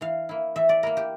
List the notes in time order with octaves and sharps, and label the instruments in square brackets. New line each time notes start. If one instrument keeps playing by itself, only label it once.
[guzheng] E3 F5
A#3 E4
E3 E5
D5
A#3 E4 A#4
G4